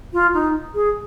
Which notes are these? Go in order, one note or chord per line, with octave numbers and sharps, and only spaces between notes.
F4
D#4
G#4